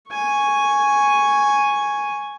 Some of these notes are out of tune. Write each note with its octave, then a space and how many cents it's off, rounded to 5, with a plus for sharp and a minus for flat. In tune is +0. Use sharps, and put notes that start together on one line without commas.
G#5 +0 C#6 +0